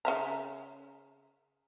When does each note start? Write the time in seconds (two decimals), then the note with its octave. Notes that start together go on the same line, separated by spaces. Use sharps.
0.05 C#3 E5 A#5